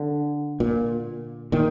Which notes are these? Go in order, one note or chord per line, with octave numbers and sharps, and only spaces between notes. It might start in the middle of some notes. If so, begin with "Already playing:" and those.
Already playing: D3
A#2
A#2 D#3